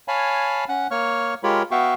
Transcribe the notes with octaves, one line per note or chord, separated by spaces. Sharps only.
C#5 F5 G#5 A5 B5
C#4 F#5 F#6
A#3 C#5 C#6 F6
G#3 F4 G4 A#4 C#5 B5
B3 F#4 E5 F5 G5 C#6